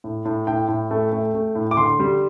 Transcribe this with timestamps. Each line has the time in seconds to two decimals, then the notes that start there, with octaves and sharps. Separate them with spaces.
0.04 A2
0.25 A2
0.47 A2 G5
0.68 A2
0.91 A3
1.12 A3
1.34 A3
1.55 A2
1.71 D6
1.77 D3 C6
2.00 G3